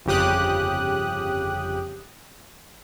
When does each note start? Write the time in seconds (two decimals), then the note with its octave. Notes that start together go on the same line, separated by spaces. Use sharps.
0.06 G1 F2 C#3 G4 D#6 F#6